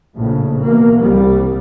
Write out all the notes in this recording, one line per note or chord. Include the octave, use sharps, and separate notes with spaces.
A#1 A2 C#3
B2 E3 A#3
C2 G3